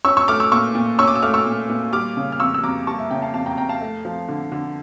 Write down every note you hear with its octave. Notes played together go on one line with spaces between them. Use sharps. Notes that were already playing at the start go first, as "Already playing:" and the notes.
C#4 C#6 E6
C#6 E6
A3 D6 F6
C#6 E6
A#2 C#6 E6
A#2
C#4 C#6 E6
D6
E6
A3 D6 F6
C#6 E6
A#2
A#2
G3 D6 F6
C#3
F6
F2 C#6 E6
E6
F2 A#5 D6
G3 A5 C#6
E5
C#3 E5 G5
F5 A5
F2 F5 A5
G5 A#5
F2 G5 A#5
F5 A5
A3
F3
D3
D3